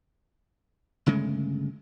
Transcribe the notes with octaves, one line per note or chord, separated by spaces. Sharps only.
G1 C#3 G#3 A3